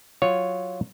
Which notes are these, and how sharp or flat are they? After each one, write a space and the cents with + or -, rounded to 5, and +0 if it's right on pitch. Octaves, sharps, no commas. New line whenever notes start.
F#3 +0 F4 +0 C#5 +0